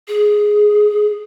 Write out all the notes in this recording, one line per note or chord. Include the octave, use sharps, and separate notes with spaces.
G#4